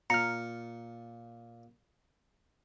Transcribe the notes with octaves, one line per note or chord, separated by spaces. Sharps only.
A#2 A#5 F6 C#7